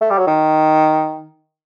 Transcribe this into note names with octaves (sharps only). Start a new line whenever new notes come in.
A3
G3
F#3
D#3